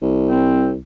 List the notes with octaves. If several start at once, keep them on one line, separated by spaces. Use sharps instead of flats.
C2
C4